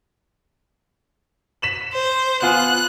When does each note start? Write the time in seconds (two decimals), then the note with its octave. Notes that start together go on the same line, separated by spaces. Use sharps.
1.62 B6 E7 F#7
1.93 C5
2.42 B3 F4 G#5 F#6